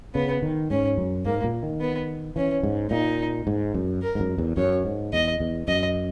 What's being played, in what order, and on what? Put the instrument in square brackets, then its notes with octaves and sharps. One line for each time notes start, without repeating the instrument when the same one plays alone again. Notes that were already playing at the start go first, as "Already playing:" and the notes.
[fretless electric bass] C#3 [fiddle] B3
[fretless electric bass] D#3
[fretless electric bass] G#2 [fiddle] C#4
[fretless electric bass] F#2
[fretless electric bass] G#2 [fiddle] A#3
[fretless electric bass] A#2
D#3
[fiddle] B3
[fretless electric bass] E3 [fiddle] C#4
[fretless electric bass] G#2
[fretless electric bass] A#2 [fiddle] D#4
[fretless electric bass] G#2
F#2
[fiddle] A#4
[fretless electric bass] G#2
F#2
E2
[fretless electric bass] F#2 [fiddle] C#5
[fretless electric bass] G#2
[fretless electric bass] E2 [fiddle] D#5
[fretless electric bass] E2
[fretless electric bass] F#2 [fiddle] D#5